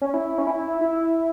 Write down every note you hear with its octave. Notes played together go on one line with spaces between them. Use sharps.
C#4
E4
C#4
E4
E4